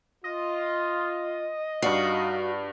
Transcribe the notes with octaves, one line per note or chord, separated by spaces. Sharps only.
F4 D#5
G2 D#4 F#4 D5 F5 C7